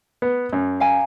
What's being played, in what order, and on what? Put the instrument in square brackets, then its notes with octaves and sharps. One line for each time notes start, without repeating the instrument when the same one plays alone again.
[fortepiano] B3
F#2
[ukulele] F5 G#5 A#5